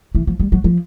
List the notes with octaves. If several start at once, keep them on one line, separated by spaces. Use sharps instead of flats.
E3
F3
G3
F#3
F3